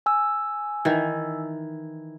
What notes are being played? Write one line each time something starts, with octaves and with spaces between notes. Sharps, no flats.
G#5 E6
D#3 E3